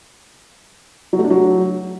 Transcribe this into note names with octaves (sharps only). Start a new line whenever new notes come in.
F#3
A3
D4
F#3